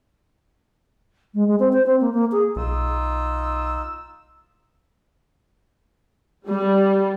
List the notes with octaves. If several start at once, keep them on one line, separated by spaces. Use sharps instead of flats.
G#3
G#3
C4
C5
C4
A#3
A#3
G#4
B1 D#4 F4 E6
G3